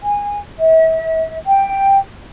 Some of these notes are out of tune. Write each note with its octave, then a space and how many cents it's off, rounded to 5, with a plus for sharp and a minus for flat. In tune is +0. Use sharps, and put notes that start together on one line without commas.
G#5 -20
E5 -40
G5 +5